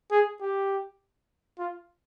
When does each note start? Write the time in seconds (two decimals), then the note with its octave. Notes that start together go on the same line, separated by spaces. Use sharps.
0.12 G#4
0.41 G4
1.59 F4